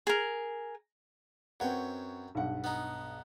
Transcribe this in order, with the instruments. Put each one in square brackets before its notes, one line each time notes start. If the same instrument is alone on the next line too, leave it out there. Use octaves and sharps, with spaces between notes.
[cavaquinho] G#4 A#4
[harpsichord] F#2 C#5 G5 [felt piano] C4 B4 F#5
[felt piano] B1 G2 F#5
[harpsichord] B3 D#4